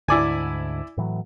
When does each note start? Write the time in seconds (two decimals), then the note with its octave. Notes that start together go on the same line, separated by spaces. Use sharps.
0.08 D2 G#2 D3 E4 D5 G#5
0.97 A2 E3 F#3